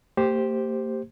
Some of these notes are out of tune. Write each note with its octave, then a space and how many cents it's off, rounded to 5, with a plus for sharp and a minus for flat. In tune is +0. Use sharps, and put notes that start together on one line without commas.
A#3 -45 G4 +0 C5 +0